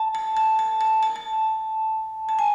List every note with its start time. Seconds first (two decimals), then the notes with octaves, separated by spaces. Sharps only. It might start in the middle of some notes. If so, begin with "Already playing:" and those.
Already playing: A5
0.15 A5
0.37 A5
0.59 A5
0.81 A5
1.03 A5
1.16 A5
2.29 A5
2.39 G#5